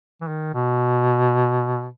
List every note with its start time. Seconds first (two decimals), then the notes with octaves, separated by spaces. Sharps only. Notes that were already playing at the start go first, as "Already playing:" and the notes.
0.21 E3
0.28 D#3
0.54 B2